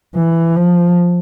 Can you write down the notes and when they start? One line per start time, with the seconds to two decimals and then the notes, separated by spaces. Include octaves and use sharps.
0.15 E3
0.55 F3